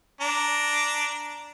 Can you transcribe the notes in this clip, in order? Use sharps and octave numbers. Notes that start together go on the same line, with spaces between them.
D4 A#5